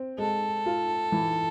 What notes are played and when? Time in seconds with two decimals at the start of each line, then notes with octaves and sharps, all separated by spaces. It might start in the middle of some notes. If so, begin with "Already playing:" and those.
Already playing: C4
0.18 G#3 A4
0.66 F4
1.12 E3